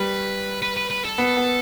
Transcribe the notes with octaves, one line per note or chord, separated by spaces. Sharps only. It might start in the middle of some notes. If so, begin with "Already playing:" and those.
Already playing: G3 B4
B4
B4
B4
A4
B3
B3